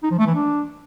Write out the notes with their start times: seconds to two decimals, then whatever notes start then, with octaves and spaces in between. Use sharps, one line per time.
0.03 D#4
0.11 F3
0.19 A3
0.27 E3
0.35 D4